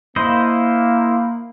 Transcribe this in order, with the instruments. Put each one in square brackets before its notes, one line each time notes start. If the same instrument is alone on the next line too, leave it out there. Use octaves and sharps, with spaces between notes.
[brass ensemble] A#3 [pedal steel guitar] E4 C5 D#5